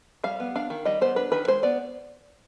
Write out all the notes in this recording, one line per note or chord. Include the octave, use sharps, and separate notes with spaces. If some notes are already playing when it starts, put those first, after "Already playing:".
G3 F5
B3
D4 F5
D#3
G3 D#5
B3 C5
D4 B4
D#3 B4
G#3 C5
B3 D5